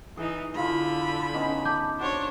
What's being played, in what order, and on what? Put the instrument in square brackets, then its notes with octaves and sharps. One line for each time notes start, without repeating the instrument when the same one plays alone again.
[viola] E3 D#4 [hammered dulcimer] G#4
[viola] D3 B5 [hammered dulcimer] E4 F4 G#4
[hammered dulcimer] B3 C#4 D#4
[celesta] A5 D6 G6
[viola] D4 C#5 [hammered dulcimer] F#4 C5